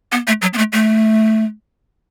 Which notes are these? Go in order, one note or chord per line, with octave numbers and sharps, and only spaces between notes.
B3
A3
F#3
B3
A3
A3